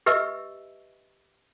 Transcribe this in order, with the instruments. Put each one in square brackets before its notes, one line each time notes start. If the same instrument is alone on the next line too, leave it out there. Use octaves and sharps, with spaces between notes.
[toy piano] G4 B4 D#5 E5 C#6 E6